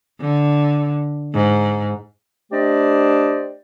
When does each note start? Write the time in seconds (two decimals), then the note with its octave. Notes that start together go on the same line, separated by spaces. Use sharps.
0.20 D3
1.33 G#2
2.52 A3 D4 G4 C5 D5 D#5